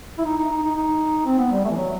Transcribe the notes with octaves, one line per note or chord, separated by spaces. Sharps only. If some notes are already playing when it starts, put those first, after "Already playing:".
E4
D#4
D#4
D#4
D#4
D#4
C4
B3
G3
A3
E3
F#3